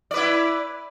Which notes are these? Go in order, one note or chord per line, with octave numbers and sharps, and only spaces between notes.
E4 B4 D5